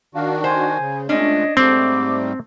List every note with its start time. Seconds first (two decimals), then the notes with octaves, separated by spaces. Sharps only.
0.15 D#3 D4 F#4 F5
0.44 C5 G#5
0.78 C#3
1.09 A#2 G#3 A3 C#4 D4 D#5
1.57 G#2 G3 A3 C4 D6